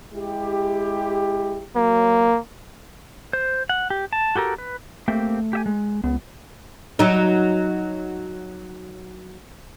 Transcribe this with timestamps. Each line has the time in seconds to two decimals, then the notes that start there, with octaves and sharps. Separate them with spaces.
0.13 G#3 E4 G4
1.76 F#3 A#3
3.33 C5
3.69 F#5
3.90 G4
4.13 A5
4.36 F#4 G4 A4 A#4
4.58 B4
5.08 A3 A#3 C4 G4
5.53 G4 E5 G#5
5.66 G#3
6.04 C#2 B3
6.99 F#3 D#4